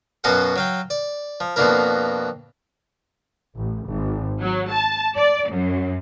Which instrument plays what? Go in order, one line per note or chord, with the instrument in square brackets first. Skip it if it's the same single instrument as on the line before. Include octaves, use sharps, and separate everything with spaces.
[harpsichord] F#2 B2 F#4 D#5 F5 F#5
F#3 F5 G5
D5
F3
F2 B2 A#3 D4 E4 A#4
[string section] A1
G#1
F#3
A5
D5
F#2